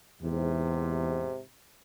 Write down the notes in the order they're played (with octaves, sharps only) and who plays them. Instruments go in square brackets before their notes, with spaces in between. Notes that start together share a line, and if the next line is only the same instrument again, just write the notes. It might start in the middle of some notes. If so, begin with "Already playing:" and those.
[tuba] E2 [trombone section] G#2 C3